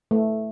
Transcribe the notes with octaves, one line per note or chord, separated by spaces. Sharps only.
A3